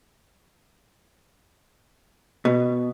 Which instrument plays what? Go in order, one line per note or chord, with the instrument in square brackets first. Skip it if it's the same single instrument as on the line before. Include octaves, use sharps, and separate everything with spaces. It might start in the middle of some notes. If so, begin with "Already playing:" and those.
[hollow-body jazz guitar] B2